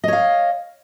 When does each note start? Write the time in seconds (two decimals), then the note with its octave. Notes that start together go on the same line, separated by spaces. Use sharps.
0.04 D#5
0.08 C#5
0.13 F5